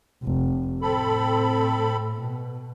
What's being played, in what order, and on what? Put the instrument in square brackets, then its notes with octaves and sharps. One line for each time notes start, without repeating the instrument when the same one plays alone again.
[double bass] F1
[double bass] A2 [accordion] C4 A4 B5
[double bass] B2